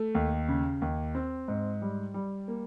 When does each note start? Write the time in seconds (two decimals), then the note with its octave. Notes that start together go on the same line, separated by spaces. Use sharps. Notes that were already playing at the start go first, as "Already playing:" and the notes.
Already playing: A3
0.15 D#2
0.48 C#3
0.82 D#2
1.15 C4
1.48 G#2
1.82 G3
2.14 G3
2.48 A#3